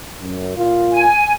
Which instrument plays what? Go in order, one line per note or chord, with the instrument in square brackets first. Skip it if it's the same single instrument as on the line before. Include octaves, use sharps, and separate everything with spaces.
[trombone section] F#2
A#2 F4
[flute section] G#5